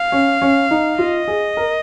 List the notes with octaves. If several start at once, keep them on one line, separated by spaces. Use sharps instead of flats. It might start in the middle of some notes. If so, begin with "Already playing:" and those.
Already playing: F5
C#4
C#4
D#4
F4 D#5
G#4
A#4